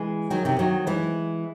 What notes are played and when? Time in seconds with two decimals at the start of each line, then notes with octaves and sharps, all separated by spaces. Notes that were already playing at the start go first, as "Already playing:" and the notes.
Already playing: E3 G#3
0.30 D#3 F#3
0.45 C3 D#3
0.59 D#3 F#3
0.87 E3 G#3